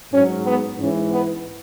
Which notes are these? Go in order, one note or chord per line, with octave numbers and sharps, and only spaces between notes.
G#2 F#3 C#4
B3
G#2 E3 C#4
B3